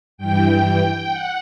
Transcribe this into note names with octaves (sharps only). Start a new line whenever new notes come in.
G2 E3 G5
F#5